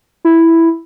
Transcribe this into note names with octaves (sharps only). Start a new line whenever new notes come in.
E4